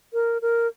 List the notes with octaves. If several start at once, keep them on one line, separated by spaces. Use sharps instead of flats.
A#4
A#4